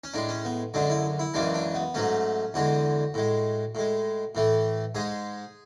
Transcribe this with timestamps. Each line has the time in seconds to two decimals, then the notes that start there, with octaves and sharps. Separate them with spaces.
0.04 C#4
0.14 A2 G#3 D4
0.29 C#4
0.45 B3
0.74 F#2 D3 G#3 D4
0.90 E4
1.19 E4
1.34 F#2 C#3 E3 G#3 D4
1.54 D4
1.75 B3
1.94 G#2 F#3 A3 C#4
2.54 E2 D3 G#3 F#4
3.14 A2 G#3
3.75 A2 G#3
4.35 A2 E3 A3
4.95 G#2 G#3 G#4